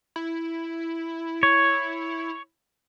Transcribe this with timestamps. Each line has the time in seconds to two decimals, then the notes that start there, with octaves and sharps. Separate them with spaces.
0.16 E4
1.43 C#5